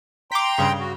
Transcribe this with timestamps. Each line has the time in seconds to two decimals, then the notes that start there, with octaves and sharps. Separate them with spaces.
0.32 G5 A#5 C6 D6 B6
0.58 G2 C#3
0.79 F#4